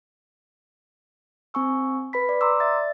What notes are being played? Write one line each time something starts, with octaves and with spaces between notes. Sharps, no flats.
C4 G#5 C#6 E6
B4 B5 B6
D5
A#5 C6 D6 E6
D5 E5 A6